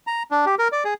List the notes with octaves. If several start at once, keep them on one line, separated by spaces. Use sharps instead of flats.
A#5
D4
G4
A#4
D5
G#4